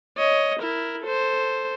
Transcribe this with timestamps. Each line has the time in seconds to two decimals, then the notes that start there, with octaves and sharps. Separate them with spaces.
0.17 C#5 D#5
0.60 E4 A#4
1.02 A4 C5